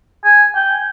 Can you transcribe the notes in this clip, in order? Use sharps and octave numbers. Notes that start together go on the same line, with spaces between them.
G#5
G5